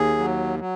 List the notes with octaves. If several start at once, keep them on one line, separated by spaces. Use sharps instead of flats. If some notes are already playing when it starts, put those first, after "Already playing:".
Already playing: D#2 G#4
F#3
F#3